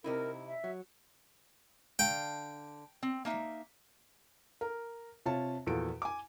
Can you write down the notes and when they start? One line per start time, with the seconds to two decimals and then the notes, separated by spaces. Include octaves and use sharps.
0.04 C3 D#4 E4 A#4
0.47 E5
0.64 F#3
1.99 D3 F5 G5
3.03 C4
3.25 A#3 D#4 E5
4.61 A#4
5.26 C3 F4 C#5 A5
5.67 E2 A#2 F3 F#4 A4 D7
6.02 G#5 D6